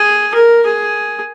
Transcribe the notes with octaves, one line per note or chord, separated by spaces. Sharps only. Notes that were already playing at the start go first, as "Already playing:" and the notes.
Already playing: G#4
A#4
G#4